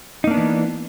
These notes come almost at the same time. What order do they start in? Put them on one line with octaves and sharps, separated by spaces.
D#4 A#3 D4 B3 E3